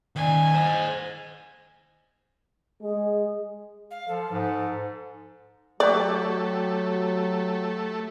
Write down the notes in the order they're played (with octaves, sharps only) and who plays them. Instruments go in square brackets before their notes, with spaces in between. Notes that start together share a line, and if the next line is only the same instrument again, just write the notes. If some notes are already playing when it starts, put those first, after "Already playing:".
[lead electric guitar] D#3 D5 [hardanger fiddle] G#5
[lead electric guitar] C5 D#5
[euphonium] G#3 [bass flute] G#4
[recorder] F5
[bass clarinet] F3 [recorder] A4
[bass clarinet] G#2
[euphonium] F#3 [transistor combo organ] A3 [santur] F#4 G4 [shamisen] D5